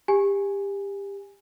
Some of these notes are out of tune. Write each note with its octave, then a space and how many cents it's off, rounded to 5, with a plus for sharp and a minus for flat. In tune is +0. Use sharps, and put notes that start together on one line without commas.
G4 +25 G#5 +0